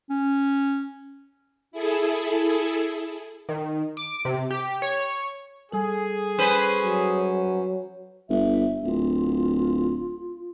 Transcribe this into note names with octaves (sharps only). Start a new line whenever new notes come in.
C#4
E4 G#4 A4
D#3
D6
C3
G4
C#5
G3 G#4 A4
C#4 B4 C5
F#3
G1 E5
D1 F4